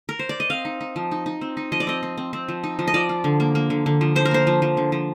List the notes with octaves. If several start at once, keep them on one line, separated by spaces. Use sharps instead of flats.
A#4
C5
D5
D#5
C4 F5
D#4
D#4
F3
D#4
D#4
C4
D#4
F3 D#5
D5
C4 D#5
C4
C4
C4
F3
D#4
F3
D#5
F3 D5
F4
D3
A#3
A#3
D3
D3
F3
D3 C5
A#4
A#3 C5
F3
F3
D3
F3